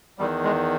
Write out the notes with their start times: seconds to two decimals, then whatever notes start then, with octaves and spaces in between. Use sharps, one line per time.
0.18 E2 D#3 G3
0.44 G#3